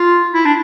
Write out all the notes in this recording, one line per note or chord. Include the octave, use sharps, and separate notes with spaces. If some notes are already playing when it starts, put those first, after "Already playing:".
Already playing: F4
E4
D4